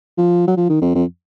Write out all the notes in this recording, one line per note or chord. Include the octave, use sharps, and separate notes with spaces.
F3
F#3
F3
D#3
F2
F2